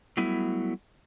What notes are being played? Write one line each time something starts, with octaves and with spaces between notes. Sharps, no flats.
F#3 G3 A3 B3 E4